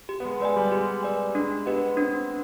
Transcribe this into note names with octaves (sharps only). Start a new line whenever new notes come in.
G4
B3
G#3
G#3 B4 D5 G#5
G3
G#3 G4
B4 D5 G#5
G#3 D4
B3 G4 B4 D#5
C4 D4